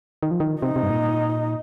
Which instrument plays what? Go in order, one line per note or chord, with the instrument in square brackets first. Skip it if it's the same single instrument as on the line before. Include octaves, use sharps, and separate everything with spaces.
[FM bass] D#3
F3
D#3
[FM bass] C3 [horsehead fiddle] D#4
[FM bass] C3
G2
A#2